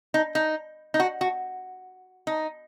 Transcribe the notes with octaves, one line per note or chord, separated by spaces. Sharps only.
D#4
D#4
D#4
F#4
F#4
D#4